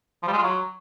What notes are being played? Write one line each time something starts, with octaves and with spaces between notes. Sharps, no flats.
F3
G3
G#3
F4
F#3